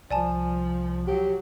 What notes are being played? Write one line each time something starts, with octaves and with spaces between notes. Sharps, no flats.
C2 F3 D5 G#5 A5
F#3 G4